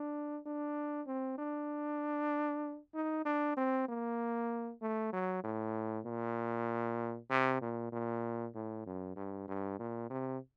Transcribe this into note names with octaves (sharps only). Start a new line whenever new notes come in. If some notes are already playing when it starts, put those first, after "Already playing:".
Already playing: D4
D4
C4
D4
D#4
D4
C4
A#3
A3
F#3
A2
A#2
C3
A#2
A#2
A2
F#2
G2
G2
A#2
C3